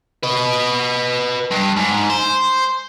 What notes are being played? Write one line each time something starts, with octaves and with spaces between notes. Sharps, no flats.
B4 D#5
G2
G#2
C5